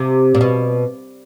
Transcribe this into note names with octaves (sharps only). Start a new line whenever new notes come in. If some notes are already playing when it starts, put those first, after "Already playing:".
Already playing: C3
A#2
B2